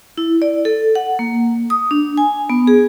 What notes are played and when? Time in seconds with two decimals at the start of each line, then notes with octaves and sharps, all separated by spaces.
0.18 E4
0.42 D5
0.65 A4
0.95 F#5
1.19 A#3
1.70 D#6
1.91 D4
2.17 G#5
2.50 B3
2.67 G#4